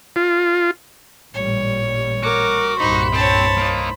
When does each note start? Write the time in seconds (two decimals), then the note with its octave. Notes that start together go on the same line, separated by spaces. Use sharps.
0.16 F4
1.34 A1 A#2 G3 C#5
2.23 F#4 A#4 D6
2.79 C2 G2 A#2 D#4 C5 B5
3.13 C4 C#5 A5
3.58 A#3 D#4